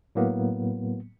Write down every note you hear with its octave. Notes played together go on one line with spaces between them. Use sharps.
A2 F#3 A#3 B3